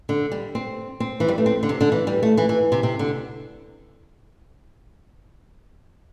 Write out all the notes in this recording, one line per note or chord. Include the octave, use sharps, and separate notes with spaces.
D3
G3
C4
C4
E3
G3
A3
C4
D3
C3
D3
E3
G3
A3
E3
E3
C3
C3
D3